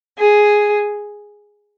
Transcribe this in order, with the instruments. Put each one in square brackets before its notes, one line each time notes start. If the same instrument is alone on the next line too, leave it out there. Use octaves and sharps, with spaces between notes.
[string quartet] G#4